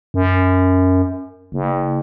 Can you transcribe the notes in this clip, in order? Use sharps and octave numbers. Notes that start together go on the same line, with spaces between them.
F#2
F#1